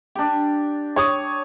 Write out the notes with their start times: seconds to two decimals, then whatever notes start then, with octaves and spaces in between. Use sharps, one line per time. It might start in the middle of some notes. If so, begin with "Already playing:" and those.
0.15 D4 G4
0.96 C#5 C#6 D#6